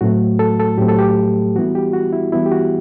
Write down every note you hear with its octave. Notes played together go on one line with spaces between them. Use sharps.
A2 F#3 A3 C4 F#4
A4
A4
A2 F#3 A3 C4 G4
A4
G4
E3 G3 B3 E4 F#4
G4
F#4
E4
E3 G3 B3 E4
G4
F#4